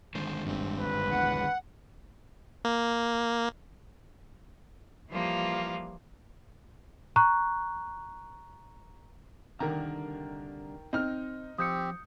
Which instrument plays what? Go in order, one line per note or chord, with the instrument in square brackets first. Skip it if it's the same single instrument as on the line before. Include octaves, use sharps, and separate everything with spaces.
[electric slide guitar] D3 D#3 G#3 [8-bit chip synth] C5
[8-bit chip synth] G1 G2 C4
[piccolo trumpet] B4
[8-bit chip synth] A#1 E2 [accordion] F#5
[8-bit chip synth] A#3
[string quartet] E3 F3 G3 A#3 F4
[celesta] A#5 C#6 F#6
[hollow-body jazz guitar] C2 D3 A#5 [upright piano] D#3 A#4
[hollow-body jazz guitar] C4 [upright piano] D#4 F6
[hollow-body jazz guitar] F3 [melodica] C4 G4 [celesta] D#6 G6 C#7